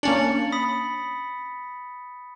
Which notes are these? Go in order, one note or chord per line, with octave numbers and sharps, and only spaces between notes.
A#3 C#4 D4 A6 C#7 F#7
B5 D#6 B6